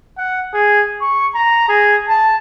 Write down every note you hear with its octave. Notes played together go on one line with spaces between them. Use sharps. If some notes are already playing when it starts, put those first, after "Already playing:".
F#5
G#4
C#6
A#5
G#4
A5